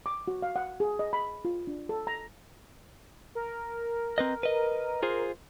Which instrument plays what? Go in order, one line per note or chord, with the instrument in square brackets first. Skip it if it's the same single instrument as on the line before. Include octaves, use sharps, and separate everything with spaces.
[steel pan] D6
F#4
F5
F#5
G#4
D#5
B5
F4
D4
A4
A#5
[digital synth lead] A#4
[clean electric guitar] C4 B4 D#5
B4 D#5
F4 G#4 C5